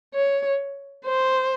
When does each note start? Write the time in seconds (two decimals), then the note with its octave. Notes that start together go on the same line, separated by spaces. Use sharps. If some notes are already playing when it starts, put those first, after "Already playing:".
0.14 C#5
1.05 C5